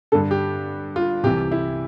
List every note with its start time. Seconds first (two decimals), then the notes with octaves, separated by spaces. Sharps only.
0.12 G2 D3 A4
0.31 G4
0.96 F4
1.24 C2 C3 E3 G4
1.52 E4